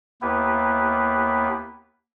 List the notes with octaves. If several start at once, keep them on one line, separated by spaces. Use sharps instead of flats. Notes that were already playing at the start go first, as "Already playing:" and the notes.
D#2 A#3 B3 E4 G4 B4